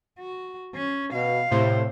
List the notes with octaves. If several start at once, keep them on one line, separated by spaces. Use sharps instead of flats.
F#4
C#4
B2 F5
A2 C3 C5